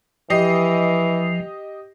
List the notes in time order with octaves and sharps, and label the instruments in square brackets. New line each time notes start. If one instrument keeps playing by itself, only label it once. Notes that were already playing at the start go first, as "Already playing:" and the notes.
[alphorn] E3 [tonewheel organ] F3 [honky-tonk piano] G4 D#5 C7